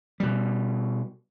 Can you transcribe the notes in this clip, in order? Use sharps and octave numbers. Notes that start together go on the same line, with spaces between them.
B2 G3